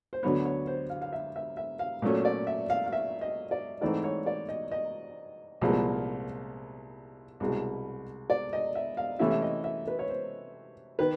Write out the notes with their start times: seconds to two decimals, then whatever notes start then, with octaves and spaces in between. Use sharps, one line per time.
0.13 C5
0.23 D2 D3 F#3 B3 C#5
0.45 C#5
0.67 C5
0.90 F5
1.01 F5
1.13 E5
1.36 E5
1.57 E5
1.79 F5
2.02 A#2 F#3 A3 C#4
2.25 D5
2.47 E5
2.70 F5
2.86 F5
2.93 E5
3.21 D#5
3.51 D5
3.81 G#2 E3 A3 C4 D#4 D5
4.04 C#5
4.26 D5
4.49 D#5
4.72 D#5
5.61 C2 A#2 F3 G#3 B3
7.40 C2 B2 G#3
8.30 D5
8.53 D#5
8.75 E5
8.97 F5
9.19 C3 E3 A3 C#4 E4 E5
9.30 E5
9.42 D#5
9.64 E5
9.87 B4
9.99 C#5
10.09 C5
10.99 D#3 B4